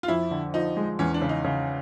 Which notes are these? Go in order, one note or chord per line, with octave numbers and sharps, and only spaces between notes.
F4
F2 E4
D3
F3 D#4
G#3
E2 C#4
D4
C#3
D#4
C#3